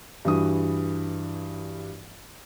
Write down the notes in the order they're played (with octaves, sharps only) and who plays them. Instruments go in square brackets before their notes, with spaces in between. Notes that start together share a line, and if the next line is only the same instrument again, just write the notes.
[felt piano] G2 E3 F#4 D#6